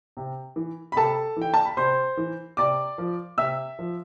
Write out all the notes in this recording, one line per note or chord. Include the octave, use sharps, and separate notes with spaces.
C3
E3
B5
C3 A4 A5
E3 G5
A5
B5
C3 C5 C6
E3
C3 D5 D6
F3
C3 E5 E6
F3